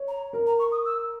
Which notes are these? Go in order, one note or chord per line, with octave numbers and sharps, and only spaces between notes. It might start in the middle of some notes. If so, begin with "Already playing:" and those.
Already playing: C#5
A#5
A#4
A#5
C#6
D#6
E6